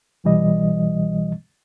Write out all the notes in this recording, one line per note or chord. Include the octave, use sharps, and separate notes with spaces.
C2 B2 E3 G3 D#5